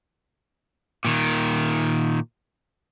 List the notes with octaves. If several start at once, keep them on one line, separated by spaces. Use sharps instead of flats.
A#2 D#3